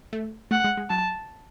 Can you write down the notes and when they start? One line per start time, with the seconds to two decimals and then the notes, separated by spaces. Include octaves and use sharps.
0.13 A3
0.51 A3 F#5
0.64 G#3
0.77 G#3
0.90 F#3 A5